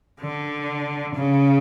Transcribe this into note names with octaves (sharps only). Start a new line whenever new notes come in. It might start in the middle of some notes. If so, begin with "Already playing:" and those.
D3
C#3